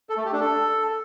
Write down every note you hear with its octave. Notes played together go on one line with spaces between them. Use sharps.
A4
A3
G4
D4
A4